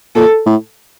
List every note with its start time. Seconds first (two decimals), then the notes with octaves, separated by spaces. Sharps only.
0.15 A#2 A4
0.46 A2